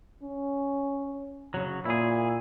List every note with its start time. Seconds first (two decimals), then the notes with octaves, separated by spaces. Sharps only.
0.23 C#4
1.54 C#3 F#3
1.85 A#2 E4 G#4